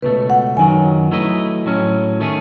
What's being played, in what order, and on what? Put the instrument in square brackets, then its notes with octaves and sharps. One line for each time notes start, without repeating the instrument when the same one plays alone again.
[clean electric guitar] C#2 B2 A3 [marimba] B4
[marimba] F#5
[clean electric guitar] F#2 D#3 F#3 [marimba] G#5
[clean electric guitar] F#3 A3 E4 B4 D#5
A2 F#3 C#4
D#3 A3 C#4 G#4